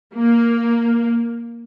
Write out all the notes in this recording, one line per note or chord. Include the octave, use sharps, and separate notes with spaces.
A#3